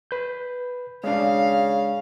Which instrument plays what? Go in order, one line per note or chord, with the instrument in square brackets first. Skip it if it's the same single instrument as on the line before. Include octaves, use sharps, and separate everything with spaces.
[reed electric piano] B4 G6
[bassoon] C#3 [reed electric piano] G#3 D4 [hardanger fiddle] F5